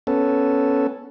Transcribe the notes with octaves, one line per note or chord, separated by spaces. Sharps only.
B3 C#4 A4